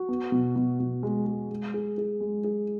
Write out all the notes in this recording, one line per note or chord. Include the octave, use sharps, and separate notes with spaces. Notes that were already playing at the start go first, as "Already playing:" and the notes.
Already playing: F#4
B3
B2
B2
B2
G#3
G#3
G#3
G#4
G#4
G#3
G#4